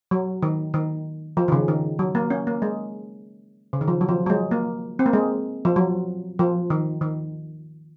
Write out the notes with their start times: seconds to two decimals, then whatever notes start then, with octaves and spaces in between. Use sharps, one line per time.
0.11 F#3
0.42 D#3
0.74 D#3
1.37 F3
1.48 D#3
1.52 C#3
1.68 D#3
1.99 F#3
2.15 A#3
2.30 C#4
2.47 A#3
2.62 G#3
3.73 C#3
3.81 D#3
3.88 F3
4.01 F#3
4.09 F3
4.26 F#3
4.30 G#3
4.51 A#3
4.99 C4
5.06 A#3
5.13 G#3
5.65 F3
5.76 F#3
6.39 F3
6.70 D#3
7.01 D#3